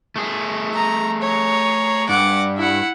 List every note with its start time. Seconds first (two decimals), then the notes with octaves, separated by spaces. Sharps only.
0.16 A3 G#4
0.74 A#5
1.22 C#5 A#5
2.09 G2 F#5 D6
2.57 E4 F#5